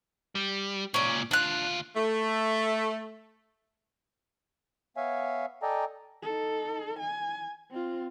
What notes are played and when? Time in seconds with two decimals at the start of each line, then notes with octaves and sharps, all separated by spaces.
0.35 G3
0.94 C#2 A#2 C#4 D5
1.31 D2 D4 F4 F#6
1.95 A3
4.97 B3 C#5 E5 F5 G#5
5.62 A4 D5 D#5 G5 G#5 A#5
6.22 D#4 A4
6.99 G#5
7.71 C4 F4